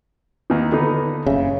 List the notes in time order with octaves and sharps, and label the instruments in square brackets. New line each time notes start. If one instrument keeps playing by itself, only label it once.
[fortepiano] D#2 E3 D#4
D3 B3 D#4
[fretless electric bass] F#1 C#3 [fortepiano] E5